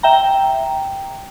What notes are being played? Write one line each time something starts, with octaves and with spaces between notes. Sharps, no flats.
E5 G5 A#5